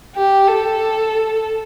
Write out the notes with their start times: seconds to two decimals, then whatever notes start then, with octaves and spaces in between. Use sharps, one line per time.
0.16 G4
0.47 A4